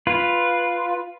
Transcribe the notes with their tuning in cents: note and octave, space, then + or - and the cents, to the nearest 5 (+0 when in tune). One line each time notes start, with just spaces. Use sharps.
F4 +0 B4 +0